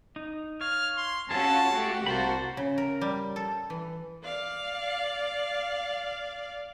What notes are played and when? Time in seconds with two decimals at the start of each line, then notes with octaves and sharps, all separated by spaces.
0.16 D#4
0.61 C#5 F5 F6
0.98 C6
1.31 C#4 F4 F#4 G#4 A4 A5
1.74 A3 F#4 G4
2.06 C2 A#3 F#4 C5 A5 B5
2.57 C#3
2.78 A#4
3.01 G3
3.36 A4
3.70 E3
4.24 D5 F5